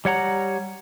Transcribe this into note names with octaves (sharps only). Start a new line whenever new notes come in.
G3 C#5 F#5 A#5